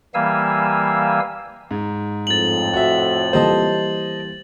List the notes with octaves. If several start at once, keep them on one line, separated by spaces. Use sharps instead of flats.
E3 G3 A#3 F5 G#5 E6
G#2
F2 A2 A6 F#7
F#4 E5
E3 G3 A#3 C5 D#5 A5